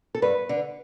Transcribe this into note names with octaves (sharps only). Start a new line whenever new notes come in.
A4
G2 B4
D3